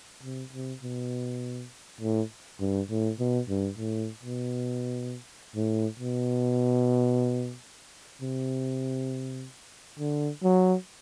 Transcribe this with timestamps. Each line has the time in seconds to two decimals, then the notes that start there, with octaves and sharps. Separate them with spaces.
0.23 C3
0.53 C3
0.83 B2
2.01 A2
2.60 G2
2.90 A2
3.19 B2
3.49 G2
3.78 A2
4.23 B2
5.56 A2
6.00 B2
8.22 C3
9.99 D3
10.43 F#3